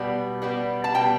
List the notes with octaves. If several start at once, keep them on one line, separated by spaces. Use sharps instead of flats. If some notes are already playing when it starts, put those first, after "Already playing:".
Already playing: B2 G3 B3
B2 G3 B3
A5
B2 G3 B3 G5